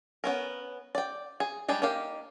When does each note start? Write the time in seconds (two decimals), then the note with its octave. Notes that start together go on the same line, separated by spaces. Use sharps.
0.24 B3 C#4 A#4
0.95 D5 G5
1.40 G#4
1.68 G3 G#3 D4 G4 G#4
1.82 A#3 D#4 G4 F5